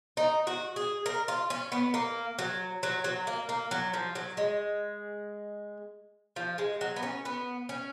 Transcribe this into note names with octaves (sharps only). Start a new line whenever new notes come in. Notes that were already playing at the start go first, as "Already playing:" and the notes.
D#4
F#4
G#4
A#4
F4
C#4
B3
A#3
F#3
F#3
F#3
A#3
A#3
F#3
F3
F#3
G#3
F3
G#3
F#3
B3
C#4
B3
C#4